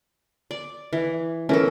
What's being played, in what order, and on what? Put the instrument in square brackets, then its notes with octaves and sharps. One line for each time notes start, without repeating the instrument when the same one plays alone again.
[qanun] D5
E3
[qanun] E3 A4 [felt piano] C#4 A#4